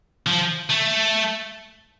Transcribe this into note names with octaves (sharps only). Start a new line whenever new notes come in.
F3
A3